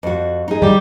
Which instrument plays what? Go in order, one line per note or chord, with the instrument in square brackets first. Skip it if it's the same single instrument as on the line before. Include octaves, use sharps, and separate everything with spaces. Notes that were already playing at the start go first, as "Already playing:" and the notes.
[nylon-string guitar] F2 F#4
D#4 G#4
[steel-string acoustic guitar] G3 G4